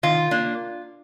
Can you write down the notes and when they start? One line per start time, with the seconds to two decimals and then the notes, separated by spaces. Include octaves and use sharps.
0.03 D#3 F4
0.31 A#3 D4